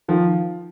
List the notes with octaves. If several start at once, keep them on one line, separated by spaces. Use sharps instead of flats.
D#3 F3